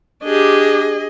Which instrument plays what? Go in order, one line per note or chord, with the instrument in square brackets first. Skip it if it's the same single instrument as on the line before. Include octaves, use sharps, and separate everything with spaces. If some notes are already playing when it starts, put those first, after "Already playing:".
[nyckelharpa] D4 G4 [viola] G#4 D#5